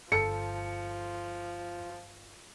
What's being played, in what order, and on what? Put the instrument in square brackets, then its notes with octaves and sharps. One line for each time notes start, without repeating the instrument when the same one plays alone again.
[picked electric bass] G1 [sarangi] F3 [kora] A4 [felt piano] C#7